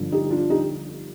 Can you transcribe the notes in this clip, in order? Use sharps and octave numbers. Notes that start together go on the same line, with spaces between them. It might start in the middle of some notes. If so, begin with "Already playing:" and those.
Already playing: G1 G2 D3 F3
D#4 G4
D4 F4
D#4 G4